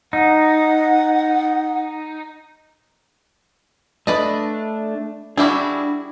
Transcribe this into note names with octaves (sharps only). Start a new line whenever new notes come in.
D#4 F#5
A3 D4 B4 D5 D#5
G3 D4 E4 F#4 G#4 D6 E6